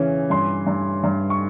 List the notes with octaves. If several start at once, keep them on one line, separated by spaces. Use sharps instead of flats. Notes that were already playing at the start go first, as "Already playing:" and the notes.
Already playing: C#3 E3 C#4
G2 C6
G2
G2
C#6